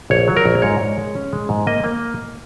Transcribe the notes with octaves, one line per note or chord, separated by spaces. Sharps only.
A#1 C#5
F#3
A#4
A#1
G#2 C#5
G#2
G#3
C#4
G#3
G#2
A#3 D#5
A#3